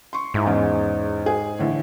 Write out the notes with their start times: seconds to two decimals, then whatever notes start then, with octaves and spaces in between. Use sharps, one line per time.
0.13 C6 C#6
0.34 G#2 E4
0.47 E2 C#4
1.26 G#4
1.59 A2 D3 E3